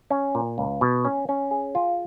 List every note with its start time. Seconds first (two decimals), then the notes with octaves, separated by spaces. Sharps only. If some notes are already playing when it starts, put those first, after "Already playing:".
0.10 C#4
0.35 A#2
0.58 C#2
0.81 B2
1.05 C#4
1.29 C#4
1.51 G#4
1.75 F4